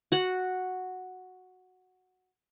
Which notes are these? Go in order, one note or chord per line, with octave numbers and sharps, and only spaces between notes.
F#4 F#5